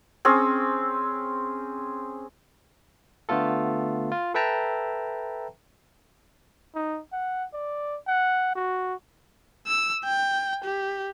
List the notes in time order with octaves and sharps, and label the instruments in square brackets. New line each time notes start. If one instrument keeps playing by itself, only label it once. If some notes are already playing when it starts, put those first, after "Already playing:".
[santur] C4 C#4 G#4
[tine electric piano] D3 A3 B3 F4 A4
F4
A4 B4 E5 G5 A5 A#5
[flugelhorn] D#4
F#5
D5
F#5
F#4
[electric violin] E6
G5
G4